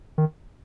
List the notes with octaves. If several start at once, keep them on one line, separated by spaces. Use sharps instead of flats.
D#3